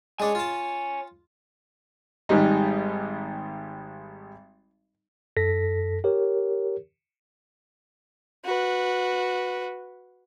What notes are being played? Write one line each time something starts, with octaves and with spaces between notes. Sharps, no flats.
G#3 D4 C#5 G#5
F4 A5
G#1 G#2 G3 D#4
F#2 A4 A#6 B6
G4 A#4 C#5
F#4 B4